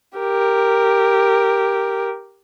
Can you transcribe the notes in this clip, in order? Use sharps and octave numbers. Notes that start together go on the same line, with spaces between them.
G4 A#4